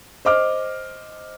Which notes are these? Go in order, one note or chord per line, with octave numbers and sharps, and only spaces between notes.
C5 D#5 D6 F6